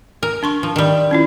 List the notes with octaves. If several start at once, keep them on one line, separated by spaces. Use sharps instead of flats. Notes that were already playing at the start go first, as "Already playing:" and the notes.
A#4
D4 C6 C#6
F3
D#3 G3
C#4 E4 F4